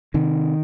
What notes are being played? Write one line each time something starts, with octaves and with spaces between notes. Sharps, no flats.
C3 D#3